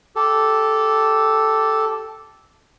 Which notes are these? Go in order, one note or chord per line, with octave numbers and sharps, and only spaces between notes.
G4 A4